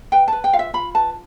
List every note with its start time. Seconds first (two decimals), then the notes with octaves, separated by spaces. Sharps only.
0.12 B4 G5
0.28 B4 A5
0.44 G5
0.53 F4 F5
0.59 E5
0.74 F4 B5
0.95 B4 A5